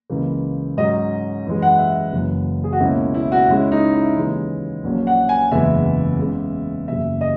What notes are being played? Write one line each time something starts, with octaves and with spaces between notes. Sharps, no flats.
C#2 C#3 E3 A#3
G#2 F#3 C#4 D#5
F#2 E3 G#3
F#5
E5
F#1 F#2 E3
G#4
F#4
C#2 B2 A#3 C#4 E4
E4
F#4
C#2 C#3 G#3 C#4 E4
D#4
E4
D#2 C#3 E3 G#3 C#4
A#1 A#2 F#3 A#3 C#4
F#5
G#5
F#1 E2 C#3 E3 G#3 E5
E2 C#3 G#3
F#1 E2 C#3 E5
D#5